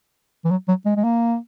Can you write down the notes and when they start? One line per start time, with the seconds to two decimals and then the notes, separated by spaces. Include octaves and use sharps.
0.45 E3
0.51 F#3
0.68 F#3
0.86 G#3
0.96 G#3
1.04 A#3